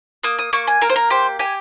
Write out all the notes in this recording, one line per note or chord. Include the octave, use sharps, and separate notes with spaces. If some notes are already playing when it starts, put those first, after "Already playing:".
A#3 D#6
D#6
A#3 C#6
G#5
A#3 A#4
C5
A#4
G4 C5
G4 G#5